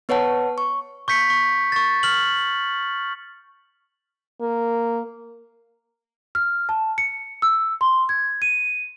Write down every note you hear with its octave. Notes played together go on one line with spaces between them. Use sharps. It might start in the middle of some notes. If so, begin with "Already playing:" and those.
B3 B4 C#5 F#5 A5
C#6
C#6 G6 B6 C#7
C#6
C#6 A6
F6 F#7
A#3
F6
A5
C#7
E6
C6
G#6
D#7